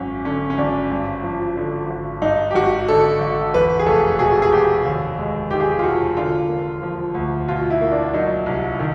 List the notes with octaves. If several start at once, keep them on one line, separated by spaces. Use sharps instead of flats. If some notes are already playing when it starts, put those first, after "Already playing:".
Already playing: G#1 F#2 C#4
D3 C#4
C#4
G#1 D4
G2
F3
D3
G#1
G2 D#4
G4
G#1 F#4
D3 A4
G#1
E2 B4
G#4
F1 A4
B2 G#4
G#4
F1 G4
D#2
G#3
D#3 G4
G#4
G4
F4
E1 F#4
D3 F4
A#3
F3
D2
B2 F4
E4
A#3
D4
F#3 D#4
C2
D#3